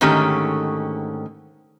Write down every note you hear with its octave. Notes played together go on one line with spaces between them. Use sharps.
G#2 D3 D#3 A3 C#4 G4